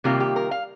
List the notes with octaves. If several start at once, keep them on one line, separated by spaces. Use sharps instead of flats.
C3 D#3 G3 A#3 F4 G4
G4
A#4
F5